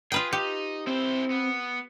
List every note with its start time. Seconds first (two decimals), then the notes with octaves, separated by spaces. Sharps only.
0.12 F4 G#4 B4 G5
0.33 D#4 G4
0.87 C4 E4 C5
1.31 B3